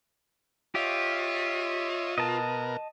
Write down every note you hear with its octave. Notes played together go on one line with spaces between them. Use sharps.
F4 G4 C#5 D#5 E5
B2 A#4 D#5 A5